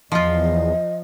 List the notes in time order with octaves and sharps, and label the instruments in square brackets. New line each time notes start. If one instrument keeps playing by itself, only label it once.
[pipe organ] E2 [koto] F3 F4 [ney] D#5